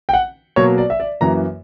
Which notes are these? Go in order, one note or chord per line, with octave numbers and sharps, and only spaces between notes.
G5
F#5
B2 F#3 A#3 C#5
D5
E5
D5
F#2 E3 A#3 A#5